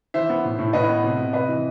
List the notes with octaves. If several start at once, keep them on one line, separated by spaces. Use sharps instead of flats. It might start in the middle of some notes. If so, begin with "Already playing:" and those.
E3 C5 E5
B3
A2
A2
A2 B4 D#5
B3
C3
C3
C3 B4 D#5
E3